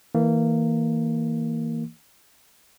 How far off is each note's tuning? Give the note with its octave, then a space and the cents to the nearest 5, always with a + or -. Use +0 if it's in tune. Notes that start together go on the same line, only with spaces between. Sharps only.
E3 -30 A#3 -20